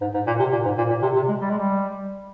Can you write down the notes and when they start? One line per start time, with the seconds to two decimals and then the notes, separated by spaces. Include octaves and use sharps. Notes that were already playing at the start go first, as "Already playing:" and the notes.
0.01 G#2
0.14 G#2
0.27 A#2
0.39 C3
0.52 A#2
0.65 G#2
0.77 A#2
0.90 A#2
1.02 C3
1.16 C3
1.28 G#3
1.41 G3
1.49 G#3
1.58 G3